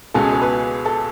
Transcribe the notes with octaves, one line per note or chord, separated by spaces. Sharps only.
C#2 B2 G#3 C#4 A4
G#4
A4
B4
A4